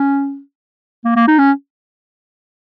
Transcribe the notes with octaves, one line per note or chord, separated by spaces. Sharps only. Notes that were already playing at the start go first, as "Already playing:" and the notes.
Already playing: C#4
A#3
A#3
D#4
C#4